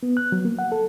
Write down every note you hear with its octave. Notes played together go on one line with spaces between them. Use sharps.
B3
F#6
F#3
A#3
F#5
A4